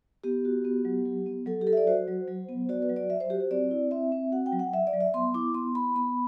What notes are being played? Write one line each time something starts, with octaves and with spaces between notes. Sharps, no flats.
B3 G4
F#4
B3
F#3
F#3
B3
F#3 A4
G4
F#3 A4
E5
D5
F#4 C5
F#3
F#3
B3
F#4 D5
B4
F#3
D5
F#3 E5
C5
F#4 G4
G4
C4 D5
E4
C4 E5
C4
F#4 F#5
G5
F#3
F#5
F#3 E5
D5
F#3
E5
B3 C6
E4 D6
B3 C6
E4 B5
B3 B5